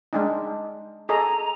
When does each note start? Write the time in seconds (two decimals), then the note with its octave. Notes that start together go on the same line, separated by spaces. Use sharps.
0.13 G#3 D4 D#4
1.09 G#4 A4 D#5 A#5